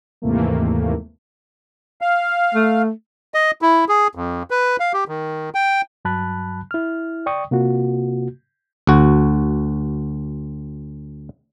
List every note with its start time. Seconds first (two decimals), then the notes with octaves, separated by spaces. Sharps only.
0.22 D#2 G#2 C3 E3 A3 A#3
2.01 F5
2.54 A3
3.34 D#5
3.62 E4
3.89 G#4
4.15 F2
4.50 B4
4.80 F5
4.93 G4
5.08 D#3
5.55 G5
6.05 G2 F#3 A5 B5 F#6
6.71 E4 F6
7.26 D5 G5 C#6 D#6
7.51 C3 A#3 F4 F#4
8.87 D2 F#4